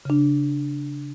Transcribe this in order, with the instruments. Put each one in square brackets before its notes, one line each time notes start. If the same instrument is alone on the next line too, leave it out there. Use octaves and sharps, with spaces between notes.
[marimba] C#3 D4